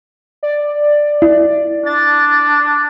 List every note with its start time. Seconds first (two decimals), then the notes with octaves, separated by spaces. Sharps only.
0.43 D5
1.22 E4
1.86 D4 A6